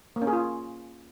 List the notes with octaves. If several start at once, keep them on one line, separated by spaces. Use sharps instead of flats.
A#3
C#4
G#4
F4